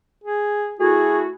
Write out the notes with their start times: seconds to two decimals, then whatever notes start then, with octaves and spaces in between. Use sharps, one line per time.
0.24 G#4
0.79 A3 E4 F#4 G#4